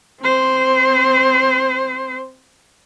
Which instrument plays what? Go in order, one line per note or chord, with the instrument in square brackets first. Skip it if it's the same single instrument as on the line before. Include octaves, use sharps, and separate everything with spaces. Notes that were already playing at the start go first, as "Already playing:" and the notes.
[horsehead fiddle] C4 C5